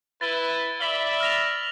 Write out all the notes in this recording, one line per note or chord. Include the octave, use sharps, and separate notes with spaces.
E4 B4 A6 G7
D5 E5 B5 B6 F#7 G7
F6 A#6 F7